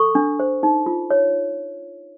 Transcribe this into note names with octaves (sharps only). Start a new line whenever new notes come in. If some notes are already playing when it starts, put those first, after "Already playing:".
Already playing: A4 C#6
D4
C5
D#4
F4
C#5